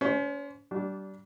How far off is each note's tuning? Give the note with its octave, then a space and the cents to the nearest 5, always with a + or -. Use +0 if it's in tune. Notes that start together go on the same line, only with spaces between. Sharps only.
C#4 +35 C5 -10
G3 -30 D4 -15